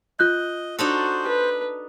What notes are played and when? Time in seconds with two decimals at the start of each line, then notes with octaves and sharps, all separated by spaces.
0.19 F4 D#5 F#6 G6
0.79 D4 D#4 F#4 A4 C5
1.27 B4